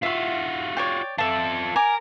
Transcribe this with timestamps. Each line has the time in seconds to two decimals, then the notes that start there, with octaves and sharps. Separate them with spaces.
0.03 F4 F#4 E5 F5
0.77 C#5 D5 G5
1.18 F4 A4 D5 E5 A5
1.76 A#4 G#5 D6